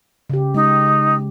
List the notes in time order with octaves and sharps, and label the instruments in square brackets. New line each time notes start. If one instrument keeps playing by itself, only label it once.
[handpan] C#3 G4
[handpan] G#3 [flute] D#4